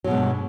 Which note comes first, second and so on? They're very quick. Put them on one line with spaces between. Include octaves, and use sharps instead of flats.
F#3 B2 G#3 G2